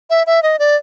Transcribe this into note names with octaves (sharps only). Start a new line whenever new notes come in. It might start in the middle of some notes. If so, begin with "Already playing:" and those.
E5
E5
D#5
D5